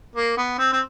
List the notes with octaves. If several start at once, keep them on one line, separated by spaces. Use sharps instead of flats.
A#3
B3
C4
C4